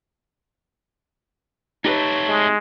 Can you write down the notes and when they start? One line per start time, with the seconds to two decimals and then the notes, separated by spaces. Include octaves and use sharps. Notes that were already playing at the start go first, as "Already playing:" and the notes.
1.85 A3 C4 D#4 G4 B4 C#5 A5
2.28 G#3